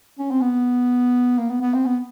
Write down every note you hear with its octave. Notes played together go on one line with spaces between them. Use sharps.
C#4
C4
B3
A#3
B3
B3
C4
B3